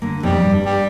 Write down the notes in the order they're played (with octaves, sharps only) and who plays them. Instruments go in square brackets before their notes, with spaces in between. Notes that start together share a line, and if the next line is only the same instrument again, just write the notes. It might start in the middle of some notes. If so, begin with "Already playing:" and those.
[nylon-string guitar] D3 A#3
[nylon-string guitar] F2 B2 D#4 [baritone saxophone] G3
[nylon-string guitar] G2
[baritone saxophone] G3